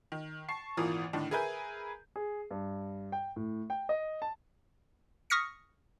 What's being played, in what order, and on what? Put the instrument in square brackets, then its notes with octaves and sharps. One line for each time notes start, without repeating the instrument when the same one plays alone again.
[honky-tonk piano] D#3
A5 C#6 C7
G#1 A#2 E3 F4 A#4 D#6
A2 D3 D#3 D4
G#4 A#4 B4 E5 G#5 G6
[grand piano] G#4
G2
G5
A2
G5
D#5
A5
[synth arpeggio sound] C#6 D#6 F6 A#6 B6 C#7